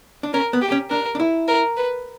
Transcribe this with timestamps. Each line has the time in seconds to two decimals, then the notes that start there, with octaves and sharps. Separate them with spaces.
0.23 D4
0.34 C#4 A#4
0.53 B3
0.62 G4
0.72 C#4
0.90 D4 A#4
1.15 D4
1.20 E4
1.48 A#4
1.77 B4